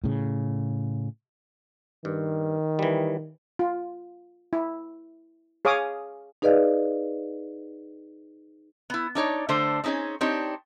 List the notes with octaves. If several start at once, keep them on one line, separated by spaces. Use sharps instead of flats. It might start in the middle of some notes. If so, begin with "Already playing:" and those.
A2 C#3
G2 D#3
E3 G3
F4
E4
G#4 C#5 F5 D6 D#6
D#4 G#4 B4 D5 D#5 F5
B3 E4
D4 D#4 C#5 D5
D3 A3 D4 C5
C4 C#4 D#4 G#4 C#5
C4 D4 D#4 G4 C#5